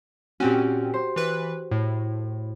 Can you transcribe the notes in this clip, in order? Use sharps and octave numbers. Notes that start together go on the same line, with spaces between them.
A#2 C4 C#4 F#4 G4
C5
E3 B4
A2